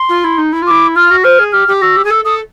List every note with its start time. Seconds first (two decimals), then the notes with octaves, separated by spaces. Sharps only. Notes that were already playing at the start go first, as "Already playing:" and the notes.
Already playing: C6
0.09 F4
0.24 E4
0.38 D#4
0.52 E4
0.62 F4
0.67 E4 D6
0.95 F4 F6
1.10 F#4
1.24 C5 F6
1.39 G#4
1.53 G4 F6
1.67 G4
1.81 F#4 E6
1.96 G4
2.04 G#4
2.10 A4 E6
2.25 A4 D#6